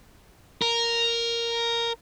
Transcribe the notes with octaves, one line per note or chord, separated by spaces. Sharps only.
A#4